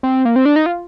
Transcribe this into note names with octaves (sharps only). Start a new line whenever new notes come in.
C4
A#3
C4
D4
D#4
F4